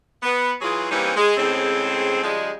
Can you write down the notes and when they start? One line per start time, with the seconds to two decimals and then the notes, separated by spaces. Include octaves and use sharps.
0.23 B3
0.61 E3 F#3 F4 G#4
0.91 E3 G3 A#3 C4 C#4 D#4
1.16 G#3
1.37 A2 C#3 G#3 C4
2.23 C#3 F3 G3 G#3